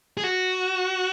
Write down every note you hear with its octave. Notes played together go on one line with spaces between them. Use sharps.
G#4
F#4